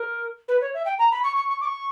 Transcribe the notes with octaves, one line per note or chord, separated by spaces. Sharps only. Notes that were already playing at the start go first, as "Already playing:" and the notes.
Already playing: A#4
B4
C#5
E5
G5
A#5
B5
C#6
C#6
C#6
D6
C#6